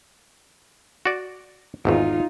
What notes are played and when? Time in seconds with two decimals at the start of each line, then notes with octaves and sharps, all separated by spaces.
1.05 F#4 D5
1.85 G#1 E2 G#2 D#4 F4